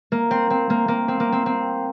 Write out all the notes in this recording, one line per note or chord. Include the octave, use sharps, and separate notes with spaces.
A#3
C4
C4
A#3
A#3
C4
A#3
C4
C4